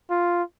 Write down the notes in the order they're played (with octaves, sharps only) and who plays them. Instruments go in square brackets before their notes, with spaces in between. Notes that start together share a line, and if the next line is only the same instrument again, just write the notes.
[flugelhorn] F4